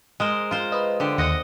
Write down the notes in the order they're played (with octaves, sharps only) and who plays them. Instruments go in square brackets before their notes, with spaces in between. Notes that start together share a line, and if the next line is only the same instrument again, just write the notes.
[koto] G#3 A#4 C5
F4 C5
[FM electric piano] B4 D#5
[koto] D3 G4
[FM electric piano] D#2 A#6 C#7 [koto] D#5 F#5